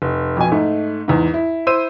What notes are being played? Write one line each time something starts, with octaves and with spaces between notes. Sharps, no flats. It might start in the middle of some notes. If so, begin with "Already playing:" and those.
F1
F2 B2 G#5
G#2 A3 D#4
E2 G#2
E4
E4 C5 E6 D#7